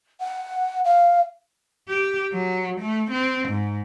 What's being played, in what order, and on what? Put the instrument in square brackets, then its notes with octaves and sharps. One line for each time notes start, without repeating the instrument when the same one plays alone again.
[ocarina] F#5
F5
[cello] G4
F#3
A3
C4
G#2